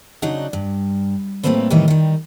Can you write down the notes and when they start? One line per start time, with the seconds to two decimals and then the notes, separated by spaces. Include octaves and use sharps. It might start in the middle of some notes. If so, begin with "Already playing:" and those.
0.22 C#3 F#3 D4 D#4 F#5
0.53 G2
1.43 A2 G3 A3 A#3 C4 B4
1.70 A2 C3 D#3 E3 G3 D#4
1.88 D#3 G3